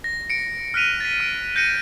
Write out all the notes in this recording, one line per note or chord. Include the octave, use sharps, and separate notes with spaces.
A#6
C#7 D7
F6 F#6 B6 D#7 F7
A6 B6
F6 D7
G6 A#6 C#7 D#7